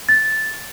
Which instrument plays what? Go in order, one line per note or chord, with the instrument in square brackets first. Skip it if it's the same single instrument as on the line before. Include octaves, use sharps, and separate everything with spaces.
[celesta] A6